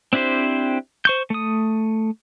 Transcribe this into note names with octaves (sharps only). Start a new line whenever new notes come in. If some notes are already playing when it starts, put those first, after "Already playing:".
C4 D4 E4 G4 C5
C5 C#6 G6
A3 D#6